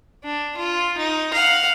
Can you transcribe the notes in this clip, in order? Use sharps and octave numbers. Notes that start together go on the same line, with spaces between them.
D4
F4
D#4
F5 F#5